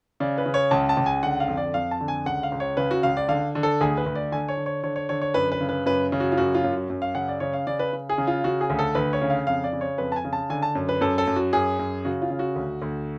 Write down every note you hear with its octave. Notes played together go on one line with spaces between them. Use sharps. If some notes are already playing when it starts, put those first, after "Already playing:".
C#3 D5
B4
C#3
C#5
C#2 A5
A5
C#2
G#5
D3 F#5
F5
F2
D5
F2 F5
A5
D3
G#5
C#2 F#5
F5
C#2
C#5
C#3 B4
F#4
C#2 F5
D5
D3 F5
D3
A4
D2 G#4
B4
D2
D5
D3 G#5
C#5
D3
C#5
D3 C#5
C#5
D3 C#5
C#5
F#2 B4
B4
C#3
B4
F#2 B4
C#3
F#4
F4
F#2 F#4
F4
F#2
F#4
F#2
F5
C#3 F#5
D5
C#3 C#5
F5
C#3 D5
B4
C#3
G#4
C#3
F4
C#3 F#4
G#4
D2
A4
D2 B4
C#5
C#3
F5
F2 F5
D5
C#3
C#5
F2 B4
A5
G#5
C#3
A5
D3 G#5
A5
F#2
B4
F#2 A4
A4
F#2
F#4
F#2 G#4
F#2
C#3 F#4
F4
C#3
F#4
D2
D2